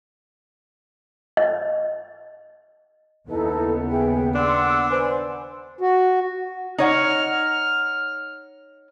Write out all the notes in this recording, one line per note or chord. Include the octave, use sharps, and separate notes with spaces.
D#5
D#2 C#3 B3 D#4 E4 A4
G#4 E5 G5
D4 F#5 C6 E6
B4 C5 G#5
F#4
D#4 C#5 F#5 F6